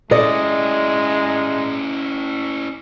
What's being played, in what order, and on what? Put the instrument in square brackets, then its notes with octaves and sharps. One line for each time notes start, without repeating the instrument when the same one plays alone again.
[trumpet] G#3 [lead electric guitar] C#4 E4 [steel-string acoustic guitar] D5 D#5